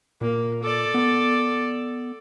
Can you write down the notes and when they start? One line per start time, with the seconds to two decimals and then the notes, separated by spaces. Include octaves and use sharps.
0.21 A#2 A#3
0.62 A4 D5
0.94 B3